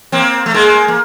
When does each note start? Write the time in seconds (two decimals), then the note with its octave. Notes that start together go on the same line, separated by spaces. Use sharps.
0.12 A#3 C4
0.46 A3
0.54 G#3 A#3
0.88 A#3